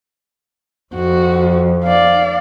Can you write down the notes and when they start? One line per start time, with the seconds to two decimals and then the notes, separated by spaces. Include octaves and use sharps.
0.94 F2 F#4
1.84 D5 F5